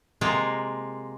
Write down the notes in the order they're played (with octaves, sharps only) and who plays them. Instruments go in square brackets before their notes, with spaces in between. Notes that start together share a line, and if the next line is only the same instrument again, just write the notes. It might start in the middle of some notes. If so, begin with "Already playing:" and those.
[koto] C3 G#3 A#3 F4